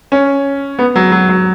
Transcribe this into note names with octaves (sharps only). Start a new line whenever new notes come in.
C#4
B3
F#3
F#3
F#3